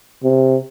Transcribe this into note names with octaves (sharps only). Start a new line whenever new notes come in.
C3